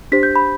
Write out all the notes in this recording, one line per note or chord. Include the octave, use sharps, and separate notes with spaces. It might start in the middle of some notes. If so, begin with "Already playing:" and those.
D4 G4 C5 B6
G6
B5